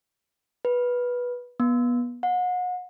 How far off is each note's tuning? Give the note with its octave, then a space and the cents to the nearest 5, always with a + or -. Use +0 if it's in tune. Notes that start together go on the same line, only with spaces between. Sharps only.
B4 -10
B3 -25
F#5 -35